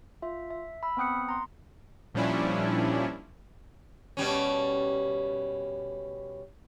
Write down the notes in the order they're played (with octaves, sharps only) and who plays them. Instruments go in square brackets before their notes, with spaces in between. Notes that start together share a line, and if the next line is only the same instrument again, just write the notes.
[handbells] F4 E5
E5
B5 E6
B3 C4 G5 D#6 F#6 C#7
A#5 C6
[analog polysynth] A#2 F3 G3 C#4 D4 E4
[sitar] B2 G3 C#4